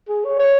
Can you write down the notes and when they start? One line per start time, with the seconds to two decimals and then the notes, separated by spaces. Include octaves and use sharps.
0.09 G#4
0.25 C#5
0.39 C#5